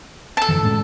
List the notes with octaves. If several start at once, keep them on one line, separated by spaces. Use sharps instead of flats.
A4 A5
F#2 D3 E3
A2 G#3 C#4